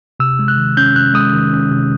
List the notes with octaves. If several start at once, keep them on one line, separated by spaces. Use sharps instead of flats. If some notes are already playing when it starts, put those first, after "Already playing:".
C3 E6
G#3
F#6
D#3
C#4 G6
C3 F#6
G#3 D#6
D#3
C#4
C3